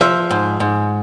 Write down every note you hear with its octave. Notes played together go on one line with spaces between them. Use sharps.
F3 E5
G#2
G#2